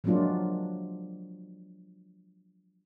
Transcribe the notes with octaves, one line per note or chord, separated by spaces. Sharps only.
F3 F#3 G#3 A#3 D4 F4